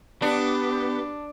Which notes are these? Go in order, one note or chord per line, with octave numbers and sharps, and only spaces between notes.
B3 D4 G4